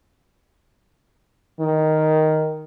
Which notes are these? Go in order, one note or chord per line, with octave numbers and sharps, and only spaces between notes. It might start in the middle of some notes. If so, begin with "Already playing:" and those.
D#3